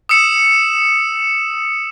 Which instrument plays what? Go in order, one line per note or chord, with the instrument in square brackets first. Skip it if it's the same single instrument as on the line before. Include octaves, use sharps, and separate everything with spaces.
[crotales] D#6 E6 C#7 E7